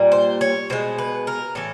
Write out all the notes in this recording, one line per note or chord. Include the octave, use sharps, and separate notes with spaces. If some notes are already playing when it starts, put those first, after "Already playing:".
Already playing: A#2 G3
C5
C#5
B2 G#3 C5
B4
A#4
A2 E3 A4